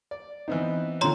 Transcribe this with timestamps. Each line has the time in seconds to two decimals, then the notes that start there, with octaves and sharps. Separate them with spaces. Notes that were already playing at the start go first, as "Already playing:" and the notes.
0.11 D5
0.48 E3 B3 C4 D#4
1.01 A#2 D3 C#5 A#5 C6